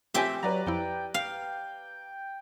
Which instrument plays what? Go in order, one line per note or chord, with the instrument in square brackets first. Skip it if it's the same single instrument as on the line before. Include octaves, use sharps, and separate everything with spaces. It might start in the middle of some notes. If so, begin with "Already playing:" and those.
[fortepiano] A#1 A3 C4 [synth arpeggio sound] F4 G5 G#5 [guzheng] G4 E5
[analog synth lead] F#3 [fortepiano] B4 D5 A#5
[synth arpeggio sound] F2 F3 E4 [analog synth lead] G5
[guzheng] F5 [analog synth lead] G5